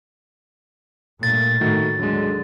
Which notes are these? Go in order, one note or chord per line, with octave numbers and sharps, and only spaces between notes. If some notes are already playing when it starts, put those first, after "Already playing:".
G2 A#2 A3 A6
A2 D#3 A3 F#4
D#2 D3 F#3 G#3